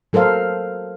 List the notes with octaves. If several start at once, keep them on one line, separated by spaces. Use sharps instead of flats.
F#3 A4 A#4 C5 F5